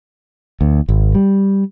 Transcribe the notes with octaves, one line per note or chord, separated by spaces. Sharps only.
D2
G#1
G3